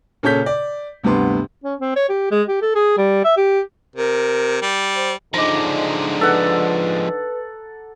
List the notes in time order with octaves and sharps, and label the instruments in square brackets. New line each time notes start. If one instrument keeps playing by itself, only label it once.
[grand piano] A#2 C#3 A4 C#5 G6 B6
D5
D2 G2 C3 B3 C6
[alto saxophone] C#4
C4
C#5
G4
G#3
G4
A4
G#4
G3
E5
G4
[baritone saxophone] C3 [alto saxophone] A#4
[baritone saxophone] G3
[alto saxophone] C5
[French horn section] D3 D4 D#4 [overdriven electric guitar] F3 G#3 [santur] A#5 D6
[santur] A4 F#5 [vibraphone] B4